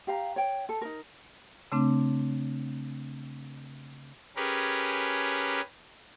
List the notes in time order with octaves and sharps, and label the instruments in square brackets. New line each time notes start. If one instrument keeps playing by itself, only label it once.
[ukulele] G4 F5 A#5
C#5 G5
A4
D#4 A#4
[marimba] C#3 A3 C4 D4
[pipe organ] C#4 G4 G#4 A#4 B4